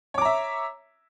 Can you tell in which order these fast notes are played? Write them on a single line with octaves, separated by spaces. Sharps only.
C#5 D6 A#5 E5